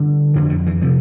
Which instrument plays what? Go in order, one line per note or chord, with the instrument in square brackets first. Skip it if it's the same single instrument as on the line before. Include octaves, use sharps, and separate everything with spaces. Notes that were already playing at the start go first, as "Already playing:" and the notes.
Already playing: [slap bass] G2 D3
F2 D3 E3
D3
E3
C3 F3